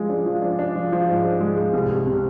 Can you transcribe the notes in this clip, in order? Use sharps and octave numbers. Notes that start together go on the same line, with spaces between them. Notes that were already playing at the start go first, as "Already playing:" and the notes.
Already playing: F3 G#3
D4
F3
D4
D4
F3
F3
G#2
D4
G#3
G#3
C2
C2
C3